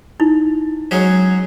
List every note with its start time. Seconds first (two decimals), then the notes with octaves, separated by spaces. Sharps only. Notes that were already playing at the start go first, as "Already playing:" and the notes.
0.20 D#4 E4
0.91 F#3 G#3 C#4